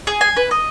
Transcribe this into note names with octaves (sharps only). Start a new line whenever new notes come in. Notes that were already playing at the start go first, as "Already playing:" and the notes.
G#4
G#5
B4
D#5